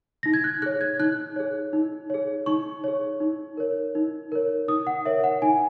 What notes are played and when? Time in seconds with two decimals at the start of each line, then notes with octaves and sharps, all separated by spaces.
0.23 D#4 A#6
0.34 G#6
0.44 F#6
0.62 G#4 C#5 F#6
0.81 G#6
0.99 D#4 F#6
1.36 G#4 C#5
1.73 D#4
2.10 G#4 C#5
2.46 D#4 C#6
2.84 G#4 C#5
3.20 D#4
3.57 A#4 C#5
3.95 D#4
4.32 A#4 C#5
4.68 D#4 D#6
4.87 F#5
5.05 A#4 C#5 E5
5.24 F#5
5.42 D#4 G#5